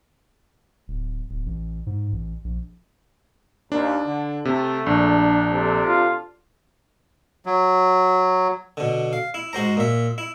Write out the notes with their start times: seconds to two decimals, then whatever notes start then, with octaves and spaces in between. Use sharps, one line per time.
0.88 D1
1.29 D1
1.46 A1
1.86 G#2
2.12 A1
2.44 A#1
3.72 D#2 D4
4.05 D3
4.45 C3 A3
4.86 A#1 D4
5.52 C3 D4 A4
5.84 F4
7.46 F#3
8.77 B2 D3
9.13 F5
9.34 E4
9.53 G#2 F#4 C5 A#5
9.77 A#2 E5
10.18 E4